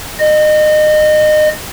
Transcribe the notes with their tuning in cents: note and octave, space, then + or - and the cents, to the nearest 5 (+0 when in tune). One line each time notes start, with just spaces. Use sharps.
D#5 -30